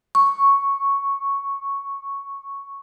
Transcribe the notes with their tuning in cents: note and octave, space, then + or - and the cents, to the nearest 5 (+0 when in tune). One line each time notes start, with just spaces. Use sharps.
C#6 -5